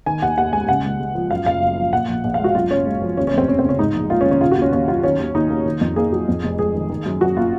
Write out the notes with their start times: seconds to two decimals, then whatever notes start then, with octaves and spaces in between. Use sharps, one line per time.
0.06 D#3 G#5
0.22 D#2 F#5
0.38 D#2 F#5
0.53 G#3 G#5
0.69 C#3 F#5
0.84 C#2
1.00 G#3
1.15 F3
1.31 F#2 F5
1.46 F#1 F5
1.62 F#1
1.77 F3
1.93 A#2 F#5
2.08 A#1
2.24 A#1
2.34 F5
2.40 G#3 F#4
2.55 F#2 F4
2.70 F#1 C#4
2.86 G#3
3.02 F3
3.17 D#2 C#4
3.27 C#4
3.33 F1 C4
3.48 F1 C#4
3.59 C4
3.64 C#3
3.69 C#4
3.79 G#2 D#4
3.95 A#1
4.10 A#3 F4
4.21 C#4
4.26 D#3
4.31 C#4
4.41 C#3 F4
4.52 F#4
4.57 D#2 C#4
4.73 D#2 C#4
4.88 F#3 F4
5.04 D#3 C#4
5.19 D#2
5.34 D#2 D#4
5.50 A#3
5.66 D#3
5.81 F2
5.96 A#3 G#4
6.12 F#3
6.28 F2
6.44 F1
6.59 G#3 G#4
6.74 D#3
6.90 D#3
7.06 F#2
7.21 F#2 F#4
7.37 A#3 F4